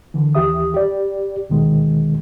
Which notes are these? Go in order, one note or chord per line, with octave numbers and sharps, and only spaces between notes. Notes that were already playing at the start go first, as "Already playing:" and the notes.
D3 E3
D#2 E3 G4 E5 D#6
G4 D5
D2 B2 D#3 G#3